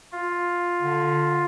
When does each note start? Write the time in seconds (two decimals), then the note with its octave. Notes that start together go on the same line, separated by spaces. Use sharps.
0.12 F4
0.82 D3